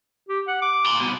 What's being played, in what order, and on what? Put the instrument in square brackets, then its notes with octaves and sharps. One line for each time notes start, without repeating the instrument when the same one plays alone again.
[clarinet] G4
F#5
D6
[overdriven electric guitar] A#5 C6
C2 B2